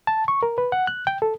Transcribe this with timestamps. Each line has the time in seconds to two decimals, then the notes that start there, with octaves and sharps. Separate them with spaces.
0.07 A5
0.28 C#6
0.43 A#4
0.58 B4
0.72 F#5
0.87 F#6
1.07 G5
1.22 A4